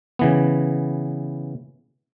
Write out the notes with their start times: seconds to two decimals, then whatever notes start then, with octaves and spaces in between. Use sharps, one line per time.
0.19 C#3 E3 B3